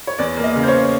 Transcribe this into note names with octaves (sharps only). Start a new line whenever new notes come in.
C#5
E2 D5
A#3
D#5
C#3
C5
C#5